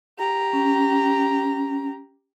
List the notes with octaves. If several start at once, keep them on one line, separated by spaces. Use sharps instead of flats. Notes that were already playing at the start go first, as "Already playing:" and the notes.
G4 A#5
C#4